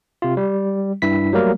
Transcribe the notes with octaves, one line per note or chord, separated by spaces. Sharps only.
C3 F4
G3
G2 E4 B6
F#3 G3 A3 A#3 A#4